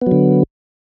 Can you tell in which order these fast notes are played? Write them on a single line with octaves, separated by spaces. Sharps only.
B3 F#3 D3